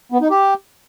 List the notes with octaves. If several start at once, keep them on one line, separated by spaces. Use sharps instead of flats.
B3
D#4
G4